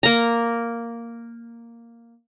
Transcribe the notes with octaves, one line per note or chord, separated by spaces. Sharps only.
A#3 A#5